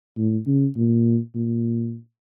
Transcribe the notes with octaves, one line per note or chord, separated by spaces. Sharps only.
A2
C#3
A#2
A#2